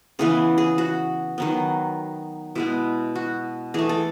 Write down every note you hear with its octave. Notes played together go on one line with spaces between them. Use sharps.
C#3 E3 B3 G#4
G#4
F#4
D#3 F#3 B3
B2 G#3 B3 E4
F#4
E3 A3 G#4
A4